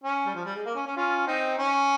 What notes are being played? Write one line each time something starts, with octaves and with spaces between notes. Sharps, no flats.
C#4
G3
F3
G3
G#3
A#3
C#4
C#4
C#4 F4
C4 D#4
C#4